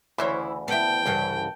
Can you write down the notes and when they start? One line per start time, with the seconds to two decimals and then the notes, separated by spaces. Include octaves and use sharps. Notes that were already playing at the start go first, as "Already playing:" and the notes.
0.18 D2 C#3 E3 E4 C5 C#5
0.68 B3 E4 G5 A5
1.06 C2 G2 C#3 E3 C5 F#5